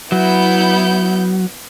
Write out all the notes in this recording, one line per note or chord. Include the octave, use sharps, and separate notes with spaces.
F#3 B3 E4 G6